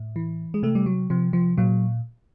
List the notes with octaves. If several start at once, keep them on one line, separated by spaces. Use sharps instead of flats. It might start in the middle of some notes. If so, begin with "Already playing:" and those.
Already playing: A2
E3
G#3
C3 A3
G3
F#3
C3 F3
F3
A#2 F#3